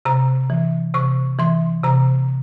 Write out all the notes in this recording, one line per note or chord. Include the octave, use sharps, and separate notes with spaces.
C3 A#5
E3
C3 C#6
E3 C6
C3 A#5